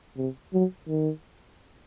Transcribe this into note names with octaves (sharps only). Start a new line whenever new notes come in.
C3
F#3
D#3